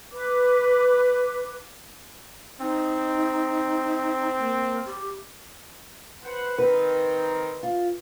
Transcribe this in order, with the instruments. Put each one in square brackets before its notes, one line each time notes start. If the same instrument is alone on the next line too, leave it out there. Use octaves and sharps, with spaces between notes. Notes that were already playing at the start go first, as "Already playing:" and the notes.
[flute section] B4 D6
[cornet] C4 [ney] D#4
[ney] A#3
G4
[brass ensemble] B4 C5 F#5
[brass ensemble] D#3 C4 D#4 [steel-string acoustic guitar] B4
[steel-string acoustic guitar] F4